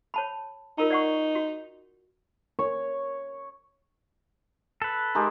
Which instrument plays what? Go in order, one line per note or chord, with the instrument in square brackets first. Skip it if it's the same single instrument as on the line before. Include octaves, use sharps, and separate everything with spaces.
[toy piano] C#5 A5 B5
[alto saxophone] D#4 [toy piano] F4 A#4 A#5
[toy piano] D5 F#5 C#6
F#4
[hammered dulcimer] C#5
[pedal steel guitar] A4 B4
[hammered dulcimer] D#3 G#3 G4